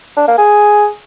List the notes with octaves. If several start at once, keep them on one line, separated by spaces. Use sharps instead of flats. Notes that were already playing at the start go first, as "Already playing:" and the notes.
D4
A#3
G#4